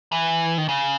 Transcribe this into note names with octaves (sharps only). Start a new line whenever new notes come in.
E3
D#3
C#3